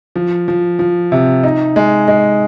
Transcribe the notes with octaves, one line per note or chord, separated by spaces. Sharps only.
F3
F3
F3
C3
D#4
G#3
G#3